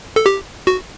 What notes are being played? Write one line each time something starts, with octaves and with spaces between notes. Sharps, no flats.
A4
G4
F#4